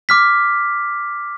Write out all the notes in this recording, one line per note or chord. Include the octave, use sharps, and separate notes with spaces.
D6 F6 B6